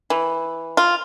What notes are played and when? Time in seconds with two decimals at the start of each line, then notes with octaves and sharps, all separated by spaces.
0.10 E3
0.77 F4